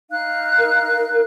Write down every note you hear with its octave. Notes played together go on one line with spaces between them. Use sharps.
D#4 F5 F#6
A#4